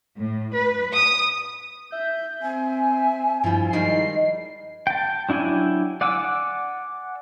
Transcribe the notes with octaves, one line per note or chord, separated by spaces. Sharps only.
A2
B4
D#6
E5 G6
C4 G#5
G2 F3 G3 E4 F4
D#3 G3 G#3 D#4 C7
G5 A5
F#3 D4 E4 G5 G#5
D5 F#5 G#5 D6 E6